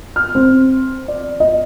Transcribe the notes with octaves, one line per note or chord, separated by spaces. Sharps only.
F6
C4
D5
D#5